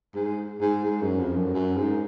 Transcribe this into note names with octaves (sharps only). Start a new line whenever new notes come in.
G#2
G#2
G#2
F#2
F2
F#2
F#2
G#2